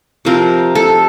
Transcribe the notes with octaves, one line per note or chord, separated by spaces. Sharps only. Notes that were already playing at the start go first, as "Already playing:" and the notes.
C3 F3 C4 A#4
A4